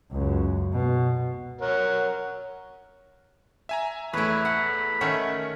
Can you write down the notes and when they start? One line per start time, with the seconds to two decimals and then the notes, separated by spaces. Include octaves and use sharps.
0.11 C#2 F#2
0.73 B2
1.61 A#4 C#5 F#5
3.69 E5 G#5 A#5
4.13 E2 A3 E4 B4 C#5
4.45 F#5 B5
5.01 D#3 A3 C#4 A#4 F#5